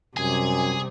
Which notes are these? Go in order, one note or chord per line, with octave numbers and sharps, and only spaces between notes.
F#2 C3 G3 G#4 G#5